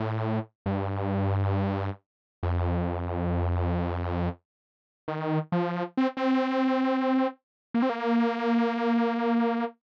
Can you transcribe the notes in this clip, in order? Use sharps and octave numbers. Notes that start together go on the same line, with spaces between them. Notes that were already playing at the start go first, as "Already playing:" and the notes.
Already playing: A2
G2
F2
D#3
F3
C4
C4
A#3
C4
A#3